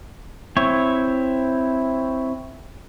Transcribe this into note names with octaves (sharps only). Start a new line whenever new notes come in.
C4 E4 C#5